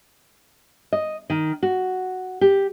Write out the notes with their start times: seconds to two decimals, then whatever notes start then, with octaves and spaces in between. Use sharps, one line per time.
0.93 D#5
1.30 D#3
1.63 F#4
2.41 G4